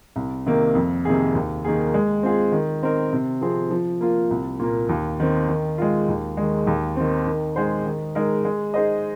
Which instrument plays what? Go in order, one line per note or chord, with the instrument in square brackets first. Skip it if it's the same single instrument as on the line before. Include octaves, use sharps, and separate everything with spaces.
[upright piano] C2
C3 D#3 A#3
F2
C3 D#3 A#3 G#4
D#2
D#3 A#3 G#4
G#3
C4 F4 G#4
D#3
C4 D#4 A#4
C3
F3 C4 G#4
F3
A#3 F4
C2
A#2 A#3
D#2
D#3 C4
D#3
G#3 F4
D#2
D#3 G#3
D#2
D#3 C4
D#3
G#3 D#4 G#4 C5
D#3
G#3 D#4 A#4
G#3
D#4 G#4 C5 D#5